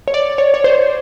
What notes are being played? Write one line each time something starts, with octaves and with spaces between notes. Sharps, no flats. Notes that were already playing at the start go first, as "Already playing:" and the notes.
C#5
D5
C#5
C#5
C5